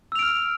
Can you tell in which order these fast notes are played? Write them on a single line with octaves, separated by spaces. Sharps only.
E6 F7 D7 F6